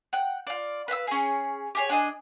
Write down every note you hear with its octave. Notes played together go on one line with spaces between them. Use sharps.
F#5 G5
F4 D5
B4 F5 B5 E6
C#4 G#4
G4 G#4 C#5
D4 G#4 D#5